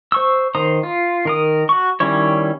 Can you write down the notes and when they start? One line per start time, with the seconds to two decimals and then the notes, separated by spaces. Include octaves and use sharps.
0.12 C5 C#6 E6
0.55 D#3 C5 A#5 D#6
0.83 F4
1.25 D#3 A#4 D#6
1.69 F#4 C#6
2.00 D#3 G3 C#4 E4 C#5